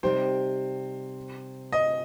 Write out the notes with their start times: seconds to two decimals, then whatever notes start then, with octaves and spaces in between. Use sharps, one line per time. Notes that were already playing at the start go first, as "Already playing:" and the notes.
0.03 C3 G3 D#4 G4 C5
1.72 D#5